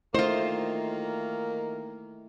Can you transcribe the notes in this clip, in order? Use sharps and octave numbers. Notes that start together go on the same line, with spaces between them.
D#3 A3 A#3 E4 F4 C5 D#5